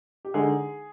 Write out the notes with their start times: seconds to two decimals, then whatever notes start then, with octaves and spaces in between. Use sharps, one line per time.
0.25 G4
0.34 D3 G#3 D#4 G#4